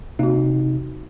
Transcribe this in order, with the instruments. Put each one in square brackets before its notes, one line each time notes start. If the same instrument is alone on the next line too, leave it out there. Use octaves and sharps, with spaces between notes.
[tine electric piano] C3 D#4 [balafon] A#3 F#4